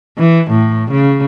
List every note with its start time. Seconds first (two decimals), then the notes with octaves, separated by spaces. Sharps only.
0.18 E3
0.50 A2
0.91 C#3